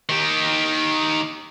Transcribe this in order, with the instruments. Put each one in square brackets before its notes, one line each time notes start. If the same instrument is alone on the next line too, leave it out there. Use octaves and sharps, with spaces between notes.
[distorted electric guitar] D#3 G4